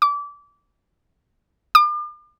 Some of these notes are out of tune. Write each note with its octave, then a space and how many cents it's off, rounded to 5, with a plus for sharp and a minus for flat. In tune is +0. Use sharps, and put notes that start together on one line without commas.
D6 -25
D6 +40